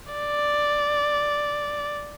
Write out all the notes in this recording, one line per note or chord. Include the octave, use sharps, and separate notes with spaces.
D5